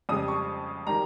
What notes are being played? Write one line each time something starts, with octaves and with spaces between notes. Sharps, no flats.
F2 C#3 G3 D#6
C#6
D#3 G3 A#5